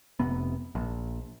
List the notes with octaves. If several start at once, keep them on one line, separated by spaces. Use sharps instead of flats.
F1 C3 B3
A#1